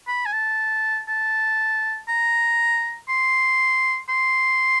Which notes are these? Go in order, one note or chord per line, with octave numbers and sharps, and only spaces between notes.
B5
G#5
A5
A5
A#5
C6
C6